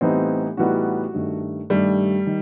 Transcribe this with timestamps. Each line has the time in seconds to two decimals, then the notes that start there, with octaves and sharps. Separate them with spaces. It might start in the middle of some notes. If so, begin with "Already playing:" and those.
0.01 A2 E3 G3 B3 C4 D#4
0.57 A2 E3 G3 B3 D#4 F#4
1.14 G2 D#3 A3
1.70 G2 D#3 G3 A3
2.27 D#3